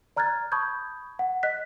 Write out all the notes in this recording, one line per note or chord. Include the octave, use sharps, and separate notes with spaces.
D5 A#5 F6 F#6 G#6 A6
A5 B5 C#6 D#6 G6 G#6
F#5
D#5 F#6 B6